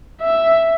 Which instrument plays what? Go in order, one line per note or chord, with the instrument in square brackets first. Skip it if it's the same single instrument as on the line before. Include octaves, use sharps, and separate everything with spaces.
[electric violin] E5